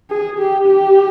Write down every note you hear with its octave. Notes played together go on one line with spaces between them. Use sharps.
G#4
G4
G4